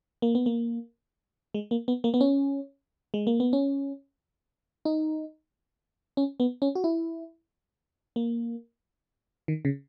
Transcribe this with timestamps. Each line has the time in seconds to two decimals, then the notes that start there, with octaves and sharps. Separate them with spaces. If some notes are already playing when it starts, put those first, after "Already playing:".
0.22 A#3
0.35 B3
0.46 A#3
1.54 G#3
1.71 A#3
1.88 B3
2.04 A#3
2.14 B3
2.21 C#4
3.14 G#3
3.27 A#3
3.40 B3
3.53 C#4
4.85 D#4
6.17 C#4
6.40 B3
6.62 C#4
6.75 F#4
6.84 E4
8.16 A#3
9.48 D#3
9.65 C#3